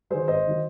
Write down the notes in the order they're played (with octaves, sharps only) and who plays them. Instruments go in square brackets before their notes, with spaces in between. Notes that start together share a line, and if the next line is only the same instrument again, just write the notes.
[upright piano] D#3 F#3 G#4 C5
G#1 C5 D#5
D#3 F#3